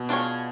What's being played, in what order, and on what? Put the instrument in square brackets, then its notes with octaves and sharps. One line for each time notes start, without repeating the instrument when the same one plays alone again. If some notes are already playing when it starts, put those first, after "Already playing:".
Already playing: [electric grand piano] B2
[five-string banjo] D4 F4 G#4 C#5